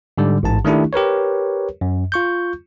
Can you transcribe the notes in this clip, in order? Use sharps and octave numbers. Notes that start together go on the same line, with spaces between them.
G#2 D3 G3
A1 G#2 A5
D#3 A3 D4 E4 G4
G4 A#4 B4 C#5
F#2
F4 C#6 G6